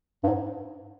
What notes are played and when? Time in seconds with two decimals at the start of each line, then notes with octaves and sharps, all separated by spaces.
0.24 G2
0.28 G#2